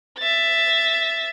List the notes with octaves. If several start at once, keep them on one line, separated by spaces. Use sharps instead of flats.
E5 A6